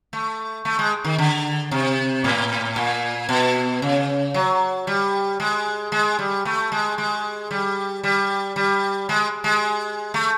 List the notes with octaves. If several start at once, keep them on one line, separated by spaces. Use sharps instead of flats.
A3
A3
G#3
D#3
D3
C3
A2
A#2
B2
C#3
F#3
G3
G#3
G#3
G3
A3
G#3
G#3
G3
G3
G3
G#3
G#3
A3